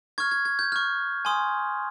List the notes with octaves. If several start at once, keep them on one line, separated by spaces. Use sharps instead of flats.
C#6 F6 G#6
G#6
G#6
G6
C#6 F6
G#5 C6 D#6